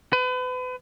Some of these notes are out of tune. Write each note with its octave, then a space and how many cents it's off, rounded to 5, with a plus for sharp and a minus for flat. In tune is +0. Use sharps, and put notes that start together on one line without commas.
B4 +35